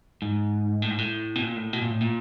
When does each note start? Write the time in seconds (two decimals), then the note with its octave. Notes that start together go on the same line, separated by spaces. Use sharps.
0.22 G#2
0.82 A2
0.90 G#2
0.98 A2
1.36 B2
1.43 A#2
1.57 A2
1.73 B2
1.82 A#2
1.91 A2
2.01 A#2